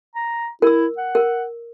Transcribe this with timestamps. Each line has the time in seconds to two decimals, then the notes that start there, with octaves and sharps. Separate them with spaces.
0.16 A#5
0.62 E4 A#4 E6
0.98 F#5
1.15 A#4